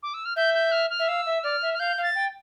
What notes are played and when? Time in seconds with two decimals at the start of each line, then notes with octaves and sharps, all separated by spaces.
0.03 D6
0.14 E6
0.25 F6
0.36 E5 G6
0.54 G6
0.72 F6
0.90 F6
0.99 E5
1.08 F5 E6
1.26 E5
1.43 D5 F6
1.62 E5
1.74 F6
1.79 F5 G6
1.98 F5
2.03 A6
2.15 G5